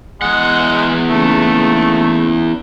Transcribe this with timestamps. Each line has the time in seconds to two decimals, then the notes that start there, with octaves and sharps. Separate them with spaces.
0.22 E2 G#3 F#5
1.09 C#3 A3 A#3 D#4